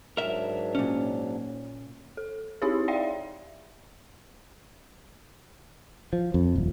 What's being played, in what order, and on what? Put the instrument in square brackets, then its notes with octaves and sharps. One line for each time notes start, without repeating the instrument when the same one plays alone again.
[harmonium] G#2 F#3 D4 [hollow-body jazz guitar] A#4 E5
[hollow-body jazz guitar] A#2 C#4
[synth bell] A4
C4 D#4 E4 G4 G#4 C#5
D5 E5 F5 G5 C6
[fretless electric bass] F3
F2
D#1